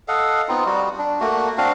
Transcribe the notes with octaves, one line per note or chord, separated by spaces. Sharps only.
A4 D#5 F5 F#5
B3 C4 D#4 F4
G3 F#4
D4
A3 A#3 F#4
C4 D4 F#4 F5